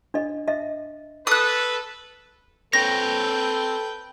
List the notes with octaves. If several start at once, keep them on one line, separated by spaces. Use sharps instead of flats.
D4 D#5
D#5 E5
A4 B4 D#6 F#6
C4 A4 B4 C#5 G5 A#6